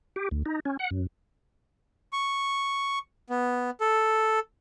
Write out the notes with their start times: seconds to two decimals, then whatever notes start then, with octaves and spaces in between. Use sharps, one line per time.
0.16 G4
0.31 D2
0.46 D#4
0.65 C#4
0.79 F#5
0.91 F#2
2.13 C#6
3.30 B3
3.81 A4